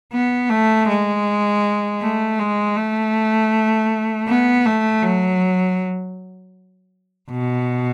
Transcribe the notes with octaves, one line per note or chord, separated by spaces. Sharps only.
B3
A3
G#3
A3
G#3
A3
B3
A3
F#3
B2